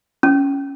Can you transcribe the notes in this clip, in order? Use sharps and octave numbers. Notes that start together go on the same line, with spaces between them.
C#4